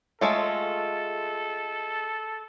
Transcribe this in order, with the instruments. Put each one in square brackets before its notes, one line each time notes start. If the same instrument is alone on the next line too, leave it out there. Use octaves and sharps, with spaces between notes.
[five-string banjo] G#3 A3 F4 [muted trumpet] A4